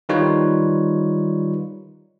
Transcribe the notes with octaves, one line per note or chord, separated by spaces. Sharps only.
D#3 G3 D#4 F4 B4 C#5